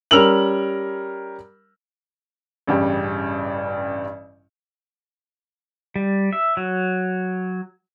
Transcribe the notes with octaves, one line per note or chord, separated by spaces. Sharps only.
G3 C#4 A#4 E6 F7 F#7
A1 G2 C#3 G4
G3
E5
F#3